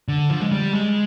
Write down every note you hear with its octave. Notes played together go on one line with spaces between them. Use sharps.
D3
F3
G#3
G3
G#3